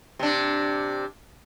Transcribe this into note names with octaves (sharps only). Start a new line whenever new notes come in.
C3 D4